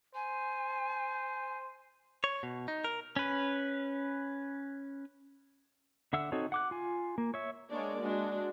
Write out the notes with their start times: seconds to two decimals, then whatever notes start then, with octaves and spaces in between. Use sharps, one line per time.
0.15 C5 G#5
2.24 C#5
2.43 B2
2.68 D#4
2.84 A#4
3.16 C#4 B4
6.13 D3 E5 F#5 E6
6.32 C4 D#4 F#4 A4 C#5
6.52 F#5 D6 F#6
6.71 F4 G#5
7.18 A#3
7.34 C#5 E5
7.70 G#3 A#3 D4 C#5 D5
8.01 G#3 D4 F#4